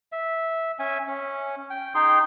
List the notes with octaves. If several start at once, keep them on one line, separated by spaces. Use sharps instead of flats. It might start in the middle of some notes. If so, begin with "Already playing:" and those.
E5
C#4 E5 G#5
C#4
G5
D#4 G#4 G5 C6